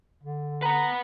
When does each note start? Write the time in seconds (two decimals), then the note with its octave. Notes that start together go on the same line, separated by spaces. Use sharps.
0.23 D3
0.62 B4 F#5 A#5